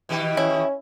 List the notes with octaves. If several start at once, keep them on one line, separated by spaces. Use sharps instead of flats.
B2 D#3 G4
C#4 E4